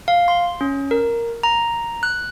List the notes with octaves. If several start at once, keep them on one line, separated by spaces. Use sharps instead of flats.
F5
C6
C#4
A#4
A#5
F#6